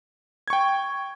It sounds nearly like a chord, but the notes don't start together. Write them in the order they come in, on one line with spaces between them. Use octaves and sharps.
G#6 C#6 G5